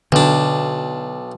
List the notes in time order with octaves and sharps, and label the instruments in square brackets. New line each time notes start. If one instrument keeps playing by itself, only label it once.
[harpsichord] B1 D4 [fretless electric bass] D3